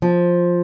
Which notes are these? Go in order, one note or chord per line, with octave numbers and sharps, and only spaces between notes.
F3